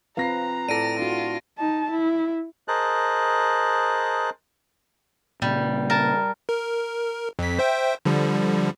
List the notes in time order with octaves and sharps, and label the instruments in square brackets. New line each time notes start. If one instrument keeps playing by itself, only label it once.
[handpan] C4 F4 B4 [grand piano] F5 A#6 C7 [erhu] A#5
[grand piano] A2 A4 [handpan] D5 [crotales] A#6 D7 D#7
[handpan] D4 F#4 [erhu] F4
[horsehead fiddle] D#4 A5
E4
[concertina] G#4 A#4 C5 D#5 A5 F#6
[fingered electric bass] A#2 C#3 [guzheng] G3
[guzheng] A#4 A5
[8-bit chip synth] A#4
F2 B6
C5 E5 G5
D3 F3 G3